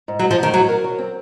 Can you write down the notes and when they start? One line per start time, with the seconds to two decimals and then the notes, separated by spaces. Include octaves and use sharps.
0.08 G#2
0.19 F#3
0.23 G#2
0.31 F3
0.39 G#2 D#3
0.54 F#3 F#4
0.69 A#4
0.84 F#3
0.99 C4